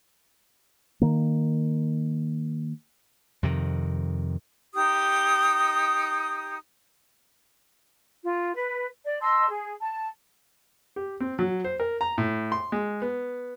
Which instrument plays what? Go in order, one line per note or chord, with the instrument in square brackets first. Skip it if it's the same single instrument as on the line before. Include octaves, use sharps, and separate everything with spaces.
[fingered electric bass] D#3 A#3
[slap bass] F2 C3 D#3
[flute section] D#4 G4 D#6
F4
B4
D5
D#5 A5 C6 E6
G#4
A5
[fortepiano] G4
C4
F#3
C5
A#4
A#5
A2
C6
G#3
B3